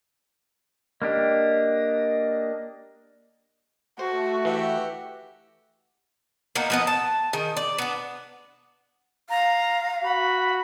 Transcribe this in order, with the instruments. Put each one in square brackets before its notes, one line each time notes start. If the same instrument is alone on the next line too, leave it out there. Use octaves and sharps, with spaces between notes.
[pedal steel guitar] A#3 D4 G4 [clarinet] D#5
[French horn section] A3 [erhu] F#4 [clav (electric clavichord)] C5
[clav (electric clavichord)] E3 [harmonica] G4 E5 F#5
[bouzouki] A#3 B3 D4 D#4
F3 B3 D#5
A5
D#3 G#4
D5
B3 D4
[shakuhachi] F5 [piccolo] A#5
[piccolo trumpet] F#4 [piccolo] B5